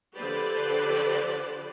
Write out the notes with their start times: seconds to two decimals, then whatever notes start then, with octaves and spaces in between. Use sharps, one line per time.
0.16 D3 F3 G4 B4 C5 D5